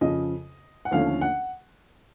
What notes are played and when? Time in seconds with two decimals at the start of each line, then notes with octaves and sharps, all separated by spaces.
0.01 F2 C#3 F3 D#5
0.85 F#5
0.91 D#2 D3 F3 A3 C#4 F5
1.21 F#5